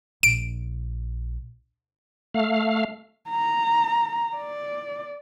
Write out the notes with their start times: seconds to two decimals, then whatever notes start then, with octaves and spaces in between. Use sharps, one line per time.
0.23 A#1 D7
2.34 A3 F5
3.30 A#5
4.36 D5